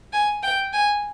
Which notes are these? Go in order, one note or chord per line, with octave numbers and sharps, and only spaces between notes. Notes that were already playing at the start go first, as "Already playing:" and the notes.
G#5
G5
G#5